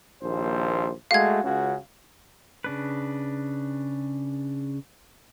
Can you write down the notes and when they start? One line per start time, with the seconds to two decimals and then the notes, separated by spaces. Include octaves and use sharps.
0.22 A#1 D#2 C5
1.11 G#3 A3 F#4 F5 G#6
1.44 C#2 C#3 F#4
2.64 C#3 D4 B4